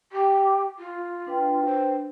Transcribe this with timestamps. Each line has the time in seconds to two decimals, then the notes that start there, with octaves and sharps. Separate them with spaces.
0.12 G4
0.78 F4
1.27 D4 B4 G5
1.65 C5